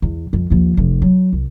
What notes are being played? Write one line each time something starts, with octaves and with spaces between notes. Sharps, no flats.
E2
F2
D#2 F3
F1 F2
F#3
C2